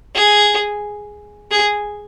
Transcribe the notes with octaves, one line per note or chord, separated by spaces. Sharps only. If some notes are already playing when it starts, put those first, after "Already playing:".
G#4
G#4